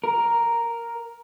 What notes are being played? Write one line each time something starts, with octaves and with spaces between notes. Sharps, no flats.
A#4